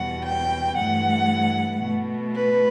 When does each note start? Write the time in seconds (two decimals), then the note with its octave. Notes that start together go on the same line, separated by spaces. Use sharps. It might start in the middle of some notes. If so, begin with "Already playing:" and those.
Already playing: E2 B2 G3 F#5
0.23 G5
0.77 G2 E3 A3 F#5
1.82 B2 A3
2.35 B4